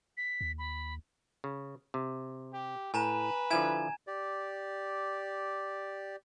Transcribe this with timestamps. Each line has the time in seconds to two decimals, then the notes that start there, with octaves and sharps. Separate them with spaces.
0.17 B6
0.41 D#2
0.58 B5
1.44 C#3
1.94 C3
2.53 G4
2.94 A2 B4 G#5 A#5 E7
3.51 D3 F3 E4 G#5 G#6 E7
4.07 G4 D5